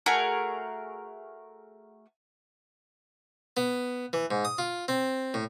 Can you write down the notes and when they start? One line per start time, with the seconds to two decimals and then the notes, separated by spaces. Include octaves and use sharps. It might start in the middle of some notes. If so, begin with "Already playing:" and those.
0.06 A3 F#4 G#4 A#4
3.57 B3
4.13 E3
4.31 G#2
4.45 D#6
4.58 F4
4.88 C4
5.34 A2